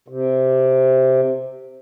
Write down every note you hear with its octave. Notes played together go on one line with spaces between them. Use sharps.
C3